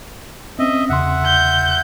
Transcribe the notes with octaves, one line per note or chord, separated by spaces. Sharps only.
C4 C#4 D#5 E5
E2 C#3 E5 F#5 C6
G6